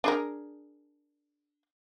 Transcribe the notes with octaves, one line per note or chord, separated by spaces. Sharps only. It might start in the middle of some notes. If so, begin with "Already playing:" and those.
D4 G#4 A#4